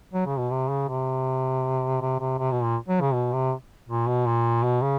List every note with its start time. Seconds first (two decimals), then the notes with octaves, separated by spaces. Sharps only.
0.14 F#3
0.26 C#3
0.38 B2
0.51 C3
0.70 C#3
0.88 C3
2.01 C3
2.20 C3
2.38 C3
2.51 B2
2.63 A#2
2.89 F#3
3.01 C#3
3.14 B2
3.32 C3
3.89 A#2
4.08 B2
4.26 A#2
4.63 B2
4.82 C#3